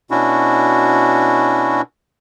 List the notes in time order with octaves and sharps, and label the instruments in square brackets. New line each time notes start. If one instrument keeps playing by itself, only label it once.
[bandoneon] B2 C#4 D4 E4 F#4